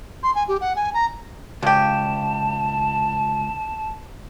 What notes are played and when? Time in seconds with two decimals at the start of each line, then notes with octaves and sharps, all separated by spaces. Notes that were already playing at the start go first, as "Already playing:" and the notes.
0.23 C6
0.35 G#5
0.48 G4
0.61 F#5
0.76 G#5
0.94 A#5
1.62 C#2 C#3 G4 A5